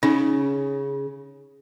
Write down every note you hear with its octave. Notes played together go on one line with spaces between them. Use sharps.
C#3 D#4